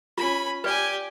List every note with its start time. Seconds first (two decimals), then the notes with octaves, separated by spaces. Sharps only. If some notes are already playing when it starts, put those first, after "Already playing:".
0.18 C#4 F4 B5
0.64 G4 B4 D5 G#5